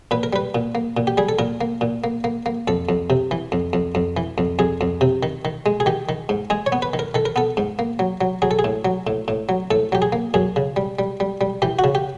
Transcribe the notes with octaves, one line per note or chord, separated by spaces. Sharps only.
A#2 B4
A#4
G3 B4
A#2
A#3
A#2
G4
G3 G#4
A4
A#2 A#4
A#3
A#2
A#3
A#3
A#3
F2 A4
F2
C3
E3
F2
F2
F2
E3
F2
F2 G#4
F2
C3
D#3
D#3
G#3
G#4
D#3 G4
D#3
G#2
G#3 G#4
C#5
B3
B4
D#3
A#4
D#3 A4
A#4
B3 A4
G#2
A#3
F#3
F#3
F#3 G#4
A4
G#4
A2
F#3
A2
A2
F#3
A2 A4
F#3 G4
G#4
A#3
F#2 G#4
C#3
G3
G3
G3
G3
E3 G4
F#4
C#3
G4